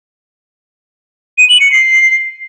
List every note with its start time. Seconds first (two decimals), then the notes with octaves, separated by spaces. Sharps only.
1.38 D#7
1.49 F#7
1.60 C#7
1.72 C7